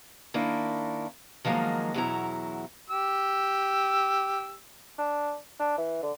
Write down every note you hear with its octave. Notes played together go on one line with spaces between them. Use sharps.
D#3 A#3 D4 E4
D#3 F3 F#3 G#3 A#3
E2 B2 F#3 C#4 E4 A#5
G4 E6
D4
D4
E3
D3